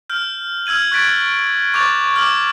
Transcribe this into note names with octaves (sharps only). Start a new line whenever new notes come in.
F6 G6
E6 F6 G#6 D#7 F#7
C#6 F#6 G#6 A6 B6 D7
C#6 D6 G6 A6 F7
D6 F6 F#7